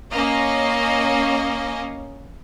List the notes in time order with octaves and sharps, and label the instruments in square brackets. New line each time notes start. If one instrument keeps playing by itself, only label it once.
[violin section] A#3 C#4 D#5